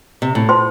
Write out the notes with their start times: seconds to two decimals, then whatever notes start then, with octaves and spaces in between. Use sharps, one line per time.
0.22 C3
0.35 A2
0.49 F4 C5 A5 C6